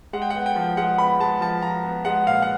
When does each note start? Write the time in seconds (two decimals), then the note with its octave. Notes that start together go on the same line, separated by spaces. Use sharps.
0.13 G#3 F#5
0.22 G5
0.30 B3 F#5
0.46 G5
0.56 F3
0.77 G#3 F#5
0.98 B3 B5
1.20 G#3 A5
1.41 F3 A5
1.62 F3 A#5
1.84 B3
2.05 G#3 F#5
2.27 A#2 F5
2.42 F#5